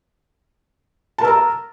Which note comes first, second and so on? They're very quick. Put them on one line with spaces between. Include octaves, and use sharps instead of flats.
A5 A#4 E6 A#5